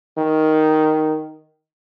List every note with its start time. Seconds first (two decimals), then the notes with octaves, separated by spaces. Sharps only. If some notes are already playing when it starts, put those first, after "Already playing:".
0.18 D#3